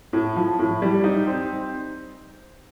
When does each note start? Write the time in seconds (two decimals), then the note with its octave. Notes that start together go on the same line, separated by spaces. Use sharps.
0.13 A2
0.36 F3
0.59 A2
0.82 G3
1.04 D#4
1.27 C4